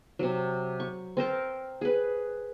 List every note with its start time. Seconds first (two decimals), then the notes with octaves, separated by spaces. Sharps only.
0.19 C3 F#3
0.80 C#6
1.17 C4 A#4 C5 A5
1.81 G#4 B4